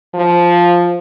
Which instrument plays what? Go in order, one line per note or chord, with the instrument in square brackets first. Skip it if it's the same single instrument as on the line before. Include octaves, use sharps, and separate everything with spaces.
[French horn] F3